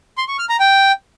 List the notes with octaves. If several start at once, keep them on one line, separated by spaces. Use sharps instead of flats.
C6
C#6
F6
A#5
G5